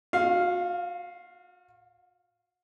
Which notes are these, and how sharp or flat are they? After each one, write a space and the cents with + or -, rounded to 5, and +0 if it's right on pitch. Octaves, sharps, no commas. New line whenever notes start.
F#4 -40 F5 +0